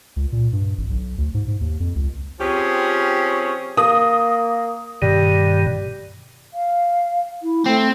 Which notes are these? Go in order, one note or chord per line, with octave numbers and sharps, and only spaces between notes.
C#2
A#2
G2
G#1
B1
D2
G#2
G#2
D#2
F2
C#2
F3 C4 C#4 G4 G#4
A#3 D#6
G2 B2 D#3 G3
F5
E4
A3 C4